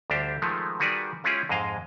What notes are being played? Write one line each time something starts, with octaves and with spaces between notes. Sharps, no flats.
D2 G3 D4 G4 C5
D#3 F3 G#3 A3
D#3 G3 F#4 G#4 B4 D5
G#3 C#4 E4 F4 G4 G#4
F2 G#2 G#3 D#5 F5